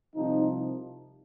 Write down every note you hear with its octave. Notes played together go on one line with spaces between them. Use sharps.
C2 C3 F3 D#4